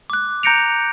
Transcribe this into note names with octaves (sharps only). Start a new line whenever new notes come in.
D6 F#6
A#5 G6 A#6 C#7 D7 F7